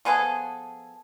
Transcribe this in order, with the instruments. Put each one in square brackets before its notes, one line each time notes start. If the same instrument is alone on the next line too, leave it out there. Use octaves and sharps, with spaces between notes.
[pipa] F3 B3 G#4 A4